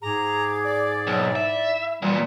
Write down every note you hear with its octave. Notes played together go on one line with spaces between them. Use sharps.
G#2 G#4 A#5 D6
D5
B1
E4 E5
E2 A#2 G3